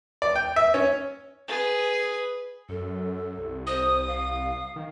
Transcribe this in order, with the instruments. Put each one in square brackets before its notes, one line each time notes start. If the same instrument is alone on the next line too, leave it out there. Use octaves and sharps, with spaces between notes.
[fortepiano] D5
G5
E5
C#4
[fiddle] G#4 B4
[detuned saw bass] F#2 [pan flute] A4
[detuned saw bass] C2
[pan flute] C5 [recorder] D#6
[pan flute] F5
[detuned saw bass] D#3